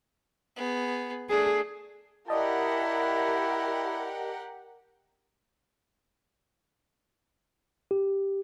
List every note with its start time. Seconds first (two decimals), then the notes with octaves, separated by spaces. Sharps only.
0.56 B3 G#4
1.30 A3 D4 G#4
2.28 E4 G4 A#4 D5 D#5 F#5 A5
7.91 G4